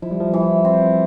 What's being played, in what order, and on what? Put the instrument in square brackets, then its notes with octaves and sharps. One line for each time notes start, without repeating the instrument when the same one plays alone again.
[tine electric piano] F3 [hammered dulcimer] E4
[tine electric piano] G3
F3
[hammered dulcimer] E3
C4